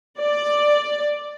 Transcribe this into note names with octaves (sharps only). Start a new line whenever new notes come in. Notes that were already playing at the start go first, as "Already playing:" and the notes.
D5